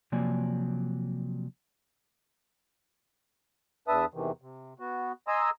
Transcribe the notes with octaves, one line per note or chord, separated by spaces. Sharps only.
C3 F3 F#3 A#3 D5 G#5
E2 D4 B4 E5 A5 D#6
E2 C3 D#3 E3
C3
B3 F#4
D#5 G#5 A#5 C6 D#6 E6